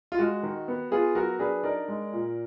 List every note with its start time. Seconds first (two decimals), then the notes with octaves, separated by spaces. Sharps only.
0.12 F4
0.19 G#3 F#4
0.43 D#3
0.68 B3
0.91 B3 F4 G#4
1.15 F#3 F#4 A#4
1.39 D4 G#4 B4
1.63 D#4 A#4 D5
1.88 G#3
2.12 A#2